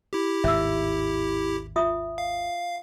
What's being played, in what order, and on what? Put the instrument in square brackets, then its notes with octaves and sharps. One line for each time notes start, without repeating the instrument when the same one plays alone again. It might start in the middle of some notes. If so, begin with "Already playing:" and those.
[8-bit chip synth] E4 G4
[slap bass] G#1 D#2 A2 [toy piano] E5 E6
[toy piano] F4 E5 D#6
[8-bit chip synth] F5